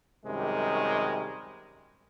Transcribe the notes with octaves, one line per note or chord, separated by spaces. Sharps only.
F#2 C3 D#3 G3 G#3